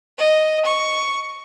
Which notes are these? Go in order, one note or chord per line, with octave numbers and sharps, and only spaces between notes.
D#5
C#6